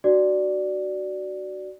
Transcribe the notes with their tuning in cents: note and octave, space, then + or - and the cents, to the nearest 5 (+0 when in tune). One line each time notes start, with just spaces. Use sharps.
D#4 -45 F#4 +20 D5 +0